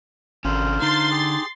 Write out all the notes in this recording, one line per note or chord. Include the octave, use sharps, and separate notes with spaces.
G#1 C#4 D4 F4 A4 A#4 C5
D3 D#4 C6 A6
G4 G#4